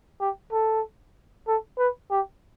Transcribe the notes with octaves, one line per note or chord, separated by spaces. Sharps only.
G4
A4
A4
B4
G4